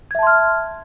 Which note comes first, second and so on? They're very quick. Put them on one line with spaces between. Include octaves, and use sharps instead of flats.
G#6 E5 A5 C6 F6